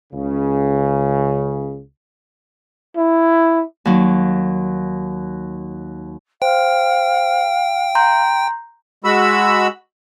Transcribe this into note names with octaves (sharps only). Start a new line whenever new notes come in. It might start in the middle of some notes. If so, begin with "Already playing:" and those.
C#2 C#3
E4
D#2 F#3
C5 F5 G5
A#5 C6 G6
G#3 F#4 B5 E6